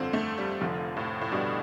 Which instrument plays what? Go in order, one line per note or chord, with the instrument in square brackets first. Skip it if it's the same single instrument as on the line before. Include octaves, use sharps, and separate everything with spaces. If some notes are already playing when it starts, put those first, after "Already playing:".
Already playing: [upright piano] G1 F2 D3 [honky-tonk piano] C4
[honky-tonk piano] A3
G3
[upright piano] F1 F2 D3 [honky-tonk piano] F3
[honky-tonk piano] A2
A2
[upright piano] G2 D3 G3 D4 [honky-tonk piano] B2